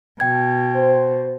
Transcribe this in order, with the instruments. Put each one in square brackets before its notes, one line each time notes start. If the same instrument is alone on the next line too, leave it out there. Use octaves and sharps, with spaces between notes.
[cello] B2 [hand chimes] G5 G#6
[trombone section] C5